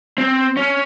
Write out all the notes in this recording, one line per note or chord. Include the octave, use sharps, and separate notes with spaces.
C4
C#4